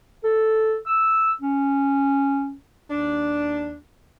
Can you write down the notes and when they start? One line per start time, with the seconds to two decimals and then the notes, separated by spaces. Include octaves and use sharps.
0.24 A4
0.86 E6
1.41 C#4
2.90 D#2 D4